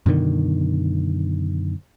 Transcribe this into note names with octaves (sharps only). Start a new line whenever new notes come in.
F#2 B2 D3 D#3